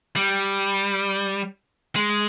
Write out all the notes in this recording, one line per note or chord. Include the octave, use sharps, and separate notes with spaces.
G3
G#3